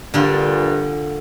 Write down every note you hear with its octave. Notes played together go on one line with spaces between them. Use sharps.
G2 A#2 D3 F4